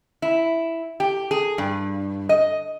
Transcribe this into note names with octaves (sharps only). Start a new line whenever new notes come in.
E4
G4
G#4
G2
D#5